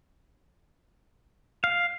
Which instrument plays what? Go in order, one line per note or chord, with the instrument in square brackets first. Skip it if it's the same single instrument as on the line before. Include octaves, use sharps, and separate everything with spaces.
[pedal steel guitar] F5